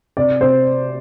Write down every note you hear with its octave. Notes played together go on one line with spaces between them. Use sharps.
C3 D5
C3 C5